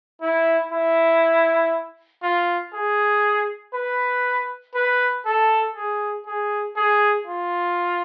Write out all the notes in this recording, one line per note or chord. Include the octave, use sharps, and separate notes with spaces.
E4
E4
F4
G#4
B4
B4
A4
G#4
G#4
G#4
F4